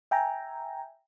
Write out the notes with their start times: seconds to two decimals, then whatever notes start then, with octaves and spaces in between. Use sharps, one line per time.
0.11 E5 G5 G#5 A#5